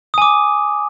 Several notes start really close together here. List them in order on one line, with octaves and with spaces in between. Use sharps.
D#6 G#5 D6